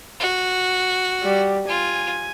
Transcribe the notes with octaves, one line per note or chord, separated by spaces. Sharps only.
F#4
G3
F4 G#5